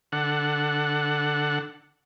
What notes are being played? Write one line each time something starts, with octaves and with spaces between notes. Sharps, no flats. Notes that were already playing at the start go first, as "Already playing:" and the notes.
D3 F#5